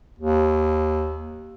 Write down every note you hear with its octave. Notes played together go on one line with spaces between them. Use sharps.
D#2